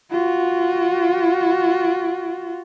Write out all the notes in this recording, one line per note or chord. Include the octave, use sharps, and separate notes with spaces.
F4 F#4